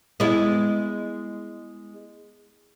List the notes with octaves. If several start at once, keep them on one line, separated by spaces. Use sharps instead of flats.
G#3 B3 E4